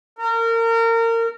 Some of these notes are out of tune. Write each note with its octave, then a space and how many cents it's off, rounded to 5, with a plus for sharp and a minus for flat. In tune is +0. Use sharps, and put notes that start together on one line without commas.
A#4 -30